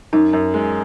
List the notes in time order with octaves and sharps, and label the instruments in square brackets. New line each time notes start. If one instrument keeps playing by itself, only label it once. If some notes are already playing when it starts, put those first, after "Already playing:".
[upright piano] F#2 [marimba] D#4
[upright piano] F#2
G#3